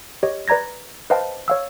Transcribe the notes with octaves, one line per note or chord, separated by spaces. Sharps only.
G4 C#5 D#5
B4 D5 A#5 G#6 A#6
B4 C5 D#5 F5 G5 A5
C#5 F5 E6